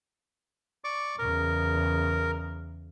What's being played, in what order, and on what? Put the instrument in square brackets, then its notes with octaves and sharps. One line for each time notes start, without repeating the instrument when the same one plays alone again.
[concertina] D5 C#6 D6
[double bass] E2 C#3 [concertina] A#4